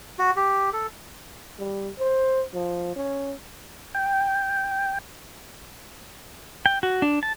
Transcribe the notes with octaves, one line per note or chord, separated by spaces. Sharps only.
F#4
G4
A4
G3
C5
F3
C#4
G5
G5
F#4
D4
A5